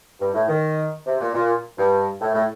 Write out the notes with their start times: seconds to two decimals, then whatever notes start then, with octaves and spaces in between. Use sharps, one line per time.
0.20 G2
0.34 A2
0.48 D#3
1.06 C3
1.20 A#2
1.34 A#2
1.78 G2
2.21 A2
2.34 A2